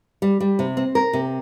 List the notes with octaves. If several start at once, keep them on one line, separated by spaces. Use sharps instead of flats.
G3
G3
C3
C4
A#4
C3